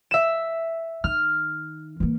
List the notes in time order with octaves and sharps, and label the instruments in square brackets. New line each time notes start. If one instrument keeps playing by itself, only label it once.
[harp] E5 E7
[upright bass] D#3 [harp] F6
[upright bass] E3 A#3